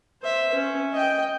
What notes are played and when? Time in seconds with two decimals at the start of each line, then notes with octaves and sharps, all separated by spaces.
0.22 C5 E5
0.54 C#4
0.93 D#5 G5